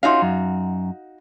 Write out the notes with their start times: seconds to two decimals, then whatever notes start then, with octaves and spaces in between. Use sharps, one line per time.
0.03 C#4 D#4 F4 F#4 F5
0.22 F#2